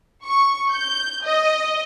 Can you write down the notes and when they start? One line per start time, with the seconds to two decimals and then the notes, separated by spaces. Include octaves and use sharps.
0.23 C#6
0.69 G6
1.23 D#5